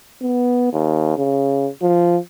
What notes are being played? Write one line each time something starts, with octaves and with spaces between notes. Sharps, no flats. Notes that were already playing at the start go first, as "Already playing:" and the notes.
B3
D#2
C#3
F3